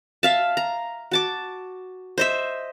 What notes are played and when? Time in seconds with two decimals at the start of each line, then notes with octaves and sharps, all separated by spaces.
0.23 E5 F5 A5
0.57 A#5
1.11 F#4 A5 D6
2.18 C5 D#5 E5